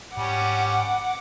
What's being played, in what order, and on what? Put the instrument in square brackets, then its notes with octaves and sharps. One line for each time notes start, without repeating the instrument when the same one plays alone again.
[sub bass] G#2 [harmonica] G3 C#4 [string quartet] F#5 D6